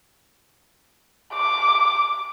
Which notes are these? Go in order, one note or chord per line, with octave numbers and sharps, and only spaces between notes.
D6